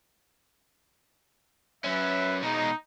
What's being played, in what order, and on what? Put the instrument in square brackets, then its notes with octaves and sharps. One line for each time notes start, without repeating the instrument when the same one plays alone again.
[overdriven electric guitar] F#3 C#4 [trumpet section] B4 E5
[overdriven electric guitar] B2 G#3 [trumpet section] D#4